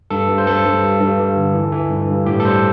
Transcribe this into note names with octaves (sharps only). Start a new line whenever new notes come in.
G2 A4
G2
C5
G2 A4
G2
G2
G2
G2
D3
E3
E3
G2
G2
A2 G4
A4
G3 C5